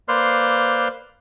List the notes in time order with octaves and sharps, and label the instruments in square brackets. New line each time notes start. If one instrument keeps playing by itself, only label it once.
[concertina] A#3 B4 C5 D5 C6 F6